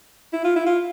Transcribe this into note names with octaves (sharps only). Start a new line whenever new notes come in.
E4
F4
E4
F4